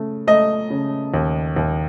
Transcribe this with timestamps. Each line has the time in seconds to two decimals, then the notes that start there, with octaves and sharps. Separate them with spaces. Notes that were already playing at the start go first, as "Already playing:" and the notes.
Already playing: C#3 A3
0.27 A3 D#5
0.70 C#3
1.14 D#2
1.56 D#2